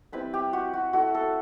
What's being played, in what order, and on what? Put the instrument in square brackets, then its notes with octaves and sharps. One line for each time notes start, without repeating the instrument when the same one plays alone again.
[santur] G3 C4 E4 B4
G4
F#4
F#4
A3 E4 F#4
A4